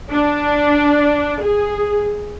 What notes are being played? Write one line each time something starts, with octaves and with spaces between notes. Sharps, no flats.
D4
G#4